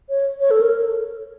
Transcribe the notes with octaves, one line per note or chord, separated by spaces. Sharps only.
C#5
C#5
A4
A#4